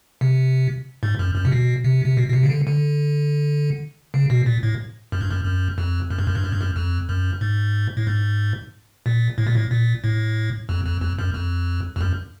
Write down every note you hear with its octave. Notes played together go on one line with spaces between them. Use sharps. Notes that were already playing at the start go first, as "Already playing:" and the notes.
C3
G#2
F#2
F#2
C3
B2
C3
C3
B2
B2
C3
C#3
D3
D3
C#3
B2
A#2
A2
F#2
G2
F#2
F#2
F2
F#2
G2
F#2
G2
F#2
G2
F#2
F2
F#2
G#2
A2
G#2
A#2
A2
A#2
A2
A#2
A2
F2
F2
F2
F#2
F2
F2
F#2